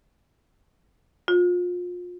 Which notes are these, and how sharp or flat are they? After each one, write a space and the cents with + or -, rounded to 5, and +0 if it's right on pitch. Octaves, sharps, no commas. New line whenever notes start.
F4 +30